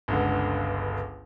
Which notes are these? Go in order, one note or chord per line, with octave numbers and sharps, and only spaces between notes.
G1 C#2 D3